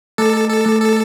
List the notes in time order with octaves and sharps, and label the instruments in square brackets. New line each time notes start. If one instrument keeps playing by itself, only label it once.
[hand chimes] A3 [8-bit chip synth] A4
[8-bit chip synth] A4
[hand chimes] A3
[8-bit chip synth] A4